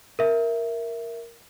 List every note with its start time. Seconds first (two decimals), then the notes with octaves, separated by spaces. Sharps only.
0.19 A#4 E5